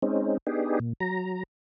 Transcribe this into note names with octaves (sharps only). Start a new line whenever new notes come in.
G#3 C4 C#4 D#4
B3 D4 D#4 G4 G#4
A#2
F#3 A#5